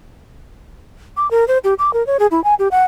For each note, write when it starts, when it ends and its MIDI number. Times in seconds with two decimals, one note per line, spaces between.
1.17 1.30 86
1.31 1.47 70
1.48 1.58 72
1.64 1.74 67
1.79 1.93 86
1.94 2.05 70
2.07 2.17 73
2.19 2.27 68
2.31 2.43 64
2.44 2.55 80
2.59 2.68 67
2.71 2.85 78